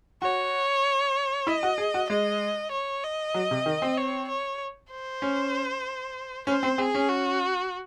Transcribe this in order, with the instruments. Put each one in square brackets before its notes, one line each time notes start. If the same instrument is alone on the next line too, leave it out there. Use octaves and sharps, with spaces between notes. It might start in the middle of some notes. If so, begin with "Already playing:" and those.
[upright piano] F#4 [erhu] C#5
[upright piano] E4 [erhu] D#5
[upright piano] F#4
G#4
F#4
[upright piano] G#3 [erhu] D#5
[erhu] C#5
D#5
[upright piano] F#3
C3
D#3
C4
[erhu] C#5
C#5
C5
[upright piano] C#4
[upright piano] C#4 [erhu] C5
[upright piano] C4
[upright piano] C4 [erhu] G#4
[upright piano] C#4
[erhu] F#4